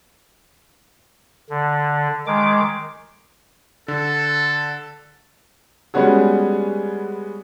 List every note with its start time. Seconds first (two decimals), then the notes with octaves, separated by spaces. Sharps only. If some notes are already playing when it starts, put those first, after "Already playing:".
1.50 D3
2.27 D#3 G#3 D6
3.88 D3 A4
5.94 G3 G#3 B3 C#4 F#4 G#4